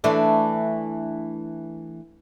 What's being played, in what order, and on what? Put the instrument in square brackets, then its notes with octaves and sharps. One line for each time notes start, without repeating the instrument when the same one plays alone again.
[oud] E3 A3 D4